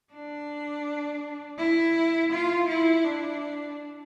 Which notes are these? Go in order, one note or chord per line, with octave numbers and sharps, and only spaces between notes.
D4
E4
F4
E4
D4